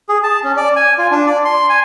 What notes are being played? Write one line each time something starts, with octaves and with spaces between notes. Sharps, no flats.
G#4
A5
C#4
D5
G#5
F4
D4
D5
C6
G#5